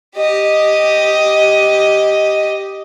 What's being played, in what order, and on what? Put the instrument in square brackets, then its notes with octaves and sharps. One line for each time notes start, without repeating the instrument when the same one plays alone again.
[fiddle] G4 D#5